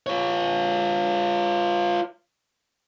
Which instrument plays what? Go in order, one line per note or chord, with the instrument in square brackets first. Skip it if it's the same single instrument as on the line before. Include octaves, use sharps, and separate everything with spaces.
[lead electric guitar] F4 C#5